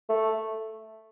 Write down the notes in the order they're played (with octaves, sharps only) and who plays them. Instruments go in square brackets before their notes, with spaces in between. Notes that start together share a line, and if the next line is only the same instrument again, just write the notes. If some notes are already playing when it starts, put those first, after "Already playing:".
[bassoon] A3